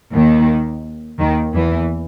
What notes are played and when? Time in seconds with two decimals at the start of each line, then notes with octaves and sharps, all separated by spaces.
0.14 D#2 D#3
1.19 D#2 D#3
1.54 E2 E3